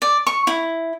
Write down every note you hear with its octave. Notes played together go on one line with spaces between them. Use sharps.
D5
C#6
E4